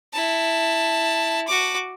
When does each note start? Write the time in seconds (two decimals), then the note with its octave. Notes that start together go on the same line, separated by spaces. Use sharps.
0.13 E4 A5
1.47 F#4 D6